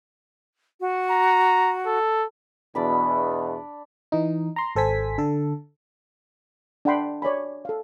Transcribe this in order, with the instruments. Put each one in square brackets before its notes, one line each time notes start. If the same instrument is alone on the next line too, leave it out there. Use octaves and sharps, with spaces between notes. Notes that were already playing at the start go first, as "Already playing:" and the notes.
[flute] F#4
[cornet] A#5
A4
[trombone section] E2 B2 [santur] D4 D5 B5
[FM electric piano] E3 D#4
A#5 C6
G#1 A4 C5 G#5 B6
D3 A4
[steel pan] D4 E5 F#5 G5 B5 C6
C#5 D5 G#5 B5
A4 F5